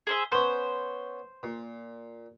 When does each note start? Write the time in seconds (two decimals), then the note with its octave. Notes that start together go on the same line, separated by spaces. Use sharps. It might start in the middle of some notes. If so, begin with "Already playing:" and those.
0.07 G#4 C5 E5
0.32 B3 C#4 C5
1.43 A#2